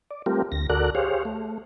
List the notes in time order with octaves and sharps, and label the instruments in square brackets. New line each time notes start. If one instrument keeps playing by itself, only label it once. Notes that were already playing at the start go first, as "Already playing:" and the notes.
[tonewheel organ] D5
G3 A3 C4 F4 G4 A#4
D2 A#6
D2 F#4 A4 A#4 D5 F#6
G4 G#4 C5 C#5 F5
A3